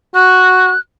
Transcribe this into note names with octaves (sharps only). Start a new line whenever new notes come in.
F#4 F#6